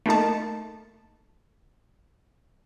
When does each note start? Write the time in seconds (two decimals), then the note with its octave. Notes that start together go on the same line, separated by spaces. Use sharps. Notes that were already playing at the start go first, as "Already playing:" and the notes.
0.06 A3 A#3 D#4 A5